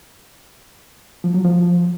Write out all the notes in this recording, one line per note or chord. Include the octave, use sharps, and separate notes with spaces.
F3
F#3
F3